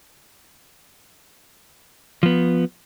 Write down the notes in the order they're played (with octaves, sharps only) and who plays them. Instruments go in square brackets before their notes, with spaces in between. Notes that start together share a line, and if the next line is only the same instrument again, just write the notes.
[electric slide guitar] F3 B3